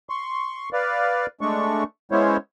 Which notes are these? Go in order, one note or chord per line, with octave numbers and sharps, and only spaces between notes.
C6 C#6
B4 D5 F5
G#3 A3 D4 C#6
G#3 B3 C#4 E4 C5 C#5